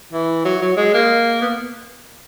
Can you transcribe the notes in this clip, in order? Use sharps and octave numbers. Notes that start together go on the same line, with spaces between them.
E3
F#3
F#3
G#3
A#3
B3